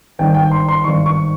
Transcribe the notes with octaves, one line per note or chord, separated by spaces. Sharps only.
G#1 G2 D#3 G5
G5
C6
C6
G#1 G2 D#3 C#6
C#6